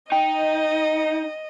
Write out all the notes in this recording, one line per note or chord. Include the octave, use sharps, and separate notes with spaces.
D#4 D#5 G5